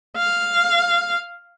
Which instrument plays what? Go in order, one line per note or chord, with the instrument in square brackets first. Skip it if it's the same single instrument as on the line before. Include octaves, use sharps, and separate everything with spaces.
[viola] F5